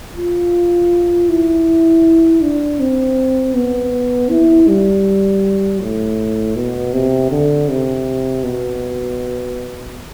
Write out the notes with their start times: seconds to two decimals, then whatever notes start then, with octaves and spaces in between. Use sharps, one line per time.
0.16 F4
1.29 E4
2.41 D4
2.80 C4
3.55 B3
4.30 E4
4.68 G3
5.81 A2
6.56 B2
6.93 C3
7.31 D3
7.69 C3
8.44 B2